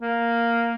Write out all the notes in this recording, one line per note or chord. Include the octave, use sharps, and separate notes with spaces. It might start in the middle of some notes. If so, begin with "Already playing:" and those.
A#3